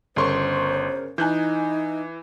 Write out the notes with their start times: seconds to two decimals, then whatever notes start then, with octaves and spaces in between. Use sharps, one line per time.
0.16 G1 C#3 A#4 C5 C#5 C6 C#6
1.18 E3 D#4 G#5 F#6 G6